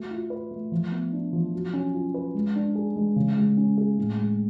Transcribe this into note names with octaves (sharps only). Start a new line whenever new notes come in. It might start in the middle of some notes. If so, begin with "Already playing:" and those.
Already playing: A3 F#4
F4
B4
A3
F3
B3
D4
F3
F#3
C#4
F4
B4
G#3
D4
G#4
G#3
C#3
G#3
C#4
G#4
A2
G#3